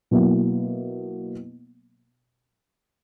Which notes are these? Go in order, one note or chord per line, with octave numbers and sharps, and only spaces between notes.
B2 F#3 A#3 E4